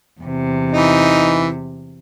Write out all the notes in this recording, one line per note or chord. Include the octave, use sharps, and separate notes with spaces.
E2 C3
E3 D#4